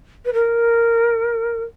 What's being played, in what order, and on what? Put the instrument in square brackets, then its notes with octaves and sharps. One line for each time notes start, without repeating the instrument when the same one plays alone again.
[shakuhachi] B4
A#4